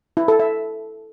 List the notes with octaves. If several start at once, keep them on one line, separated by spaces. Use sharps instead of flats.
E4
A4
E5